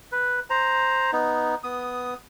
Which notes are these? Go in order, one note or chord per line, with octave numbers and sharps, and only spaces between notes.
B4
C5 A#5
B3 D#4
B3 D#6